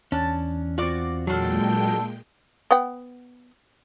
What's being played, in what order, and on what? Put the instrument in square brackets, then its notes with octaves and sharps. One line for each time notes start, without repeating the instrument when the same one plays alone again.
[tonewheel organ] E2 [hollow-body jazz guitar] C#4 D4 [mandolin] A5
[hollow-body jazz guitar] C4 F4 [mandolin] F#4 D5 D6
[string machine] A#2 G#3 G5 [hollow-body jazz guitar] F#3 F#4 [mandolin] D4 F4 A4
[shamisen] B3 F#5 G5